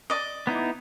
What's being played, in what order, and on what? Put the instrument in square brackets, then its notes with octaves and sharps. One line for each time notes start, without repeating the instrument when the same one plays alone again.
[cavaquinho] D5 D#5
[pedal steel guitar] B3 D#4 E4